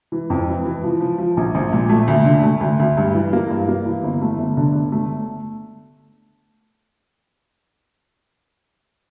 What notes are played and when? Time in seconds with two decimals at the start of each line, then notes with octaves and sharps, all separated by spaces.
0.12 E3
0.30 F2
0.47 E3
0.65 E3
0.84 F3
1.00 F3
1.18 F3
1.37 A#1
1.55 A#1
1.73 A#2
1.89 A3
2.08 D2
2.25 D3
2.43 A3
2.61 D2
2.80 D2
2.97 G2
3.15 E3
3.33 A#3
3.50 G2
3.68 A#3
3.86 E3
4.04 G1
4.22 A3
4.39 G1
4.57 D3
4.75 G1
4.92 A3